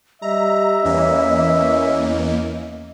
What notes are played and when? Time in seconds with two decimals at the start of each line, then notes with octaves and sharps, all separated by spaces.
0.22 G3 D#5 E5 A#5
0.85 E2 E3 A#3 C#4